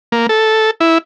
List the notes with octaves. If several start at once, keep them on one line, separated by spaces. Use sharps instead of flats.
A#3
A4
E4